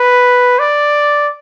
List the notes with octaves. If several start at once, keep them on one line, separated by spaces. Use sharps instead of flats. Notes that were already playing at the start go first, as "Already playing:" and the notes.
Already playing: B4
D5